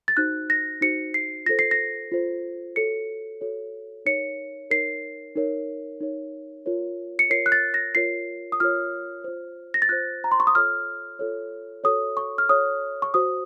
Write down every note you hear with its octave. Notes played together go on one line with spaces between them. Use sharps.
A6
D#4 F#4 C5 F#6
A#6
D#4 F#4 C5 C#7
C7
F4 A4 C5 A#6
C7
A#6
F4 A4 C5
F#4 A4 C#5 C#7
F#4 A4 C#5
D#4 A#4 C#5 C#7
D#4 A#4 C#5 C7
D#4 A#4 C#5
D#4 A#4 C#5
F4 A#4 C#5
C#7
F4 A#4 C#5 C7
F#6
A6
A#6
F4 A#4 C#5 C7
D#6
F4 A#4 C#5 F6
F4 C5
A#6
A6
F4 C5 F#6
A#5
C6
C#6
D#6
F4 A4 C#5 F6
F4 A4 C#5
F#4 A4 C#5 D#6
C#6
F6
F#4 A4 C#5 D#6
C#6
F#4 C5 D#6